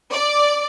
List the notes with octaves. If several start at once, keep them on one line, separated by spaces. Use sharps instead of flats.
D5